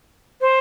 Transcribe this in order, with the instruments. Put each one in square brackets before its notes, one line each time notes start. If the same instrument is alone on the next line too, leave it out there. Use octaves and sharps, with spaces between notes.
[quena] C5